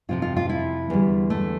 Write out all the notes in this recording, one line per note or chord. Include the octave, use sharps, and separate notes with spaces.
F2 C3 F3 F4
F4
F4
E4
E2 D3 G3
A3